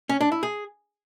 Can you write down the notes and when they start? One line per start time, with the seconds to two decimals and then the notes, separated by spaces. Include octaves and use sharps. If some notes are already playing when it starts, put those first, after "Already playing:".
0.09 C#4
0.21 D4
0.32 E4
0.43 G#4